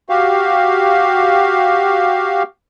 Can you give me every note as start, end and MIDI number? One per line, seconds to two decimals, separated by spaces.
0.09 2.43 66
0.09 2.43 67
0.09 2.43 77